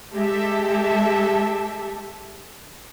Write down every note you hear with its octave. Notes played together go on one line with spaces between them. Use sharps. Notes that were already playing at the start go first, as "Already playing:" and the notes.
G#3 G4 A4 E5